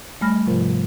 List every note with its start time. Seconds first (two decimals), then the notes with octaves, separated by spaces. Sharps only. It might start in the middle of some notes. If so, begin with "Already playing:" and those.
0.21 G3 A3 G#5 B5 F6 A#6
0.47 G#2 C3 F3 F4 A#4 C5